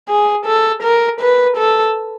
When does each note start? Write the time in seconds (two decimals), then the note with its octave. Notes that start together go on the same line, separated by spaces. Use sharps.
0.09 G#4
0.46 A4
0.83 A#4
1.21 B4
1.57 A4